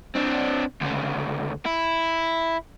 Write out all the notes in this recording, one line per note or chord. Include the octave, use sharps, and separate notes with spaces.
C4 D4
D2 C#3
E4